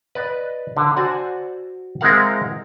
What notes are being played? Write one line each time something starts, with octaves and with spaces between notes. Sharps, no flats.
B4 D5 D#5
D3
F#4 C5 D5 F#5 G#5
G#3 C4 E4 A#4 F5 F#5